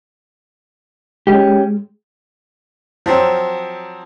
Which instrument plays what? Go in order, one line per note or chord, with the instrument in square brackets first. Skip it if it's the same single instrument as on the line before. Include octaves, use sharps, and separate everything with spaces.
[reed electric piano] G#3 [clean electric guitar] C#4 G4
[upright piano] F3 F#3 C4